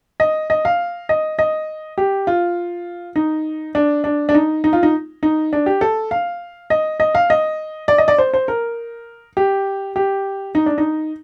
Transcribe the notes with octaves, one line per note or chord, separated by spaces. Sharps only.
D#5
D#5
F5
D#5
D#5
G4
F4
D#4
D4
D4
D4
D#4
D#4
F4
D#4
D#4
D4
G4
A4
F5
D#5
D#5
F5
D#5
D5
D#5
D5
C5
C5
A#4
G4
G4
D#4
D4
D#4